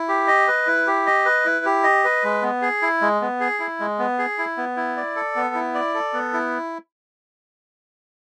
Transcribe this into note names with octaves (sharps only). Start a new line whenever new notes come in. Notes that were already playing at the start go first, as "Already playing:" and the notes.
Already playing: E4
G4
D#5
B4
E4
G4
D#5
B4
E4
G4
D#5
B4
G#3
B3
G#4
E4
G#3
B3
G#4
E4
G#3
B3
G#4
E4
B3
E4
D5
A4
B3
E4
D5
A4
B3
E4